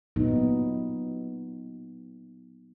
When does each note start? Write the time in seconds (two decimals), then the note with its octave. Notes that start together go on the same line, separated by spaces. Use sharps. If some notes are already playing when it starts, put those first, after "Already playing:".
0.16 A#2 F#3 B3 D#4